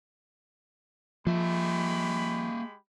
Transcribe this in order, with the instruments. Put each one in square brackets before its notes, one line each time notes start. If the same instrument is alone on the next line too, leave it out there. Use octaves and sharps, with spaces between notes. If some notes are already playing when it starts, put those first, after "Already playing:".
[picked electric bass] F3 [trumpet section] G#3 G4 B5 [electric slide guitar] A#3 E5